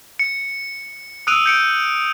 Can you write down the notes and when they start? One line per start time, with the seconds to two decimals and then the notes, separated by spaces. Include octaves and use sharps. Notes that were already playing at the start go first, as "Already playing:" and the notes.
0.19 C#7
1.27 D#6 E6 F#6 D7 D#7 F7
1.46 G6 C#7 D7